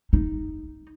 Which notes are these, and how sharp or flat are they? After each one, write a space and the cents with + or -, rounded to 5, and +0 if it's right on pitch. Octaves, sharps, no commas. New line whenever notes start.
D#4 +0